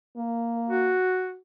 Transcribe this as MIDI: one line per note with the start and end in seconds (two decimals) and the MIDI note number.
0.17 0.95 58
0.69 1.36 66